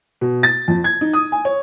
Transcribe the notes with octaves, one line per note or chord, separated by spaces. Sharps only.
B2
A6
F2
G#6
D#4
D#6
G#5
C#5